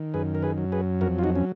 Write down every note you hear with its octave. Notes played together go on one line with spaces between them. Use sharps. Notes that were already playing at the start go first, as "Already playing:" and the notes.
Already playing: D#3
F#2 G#4 B4
A#4
G#4 B4
F#3
G#4 B4
F2 F#4 A#4
F4
D#4 F#4
C#4